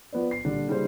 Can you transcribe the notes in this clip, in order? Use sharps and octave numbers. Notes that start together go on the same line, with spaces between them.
F3 B3 B4 D5
C7
A#2 D3 G3 D4
C#3 G3 A#3 D4 E4 C5